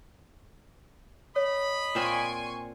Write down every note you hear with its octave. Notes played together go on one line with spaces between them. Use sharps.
C#5 D#5 B5
A#2 C4 D5 G#5 C6 C#6